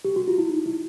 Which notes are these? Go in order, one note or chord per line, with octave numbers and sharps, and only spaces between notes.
G4
F#4
F4
E4
D#4
E4